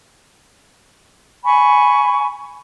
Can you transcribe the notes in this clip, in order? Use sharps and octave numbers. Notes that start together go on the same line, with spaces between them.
G#5 B5 C#6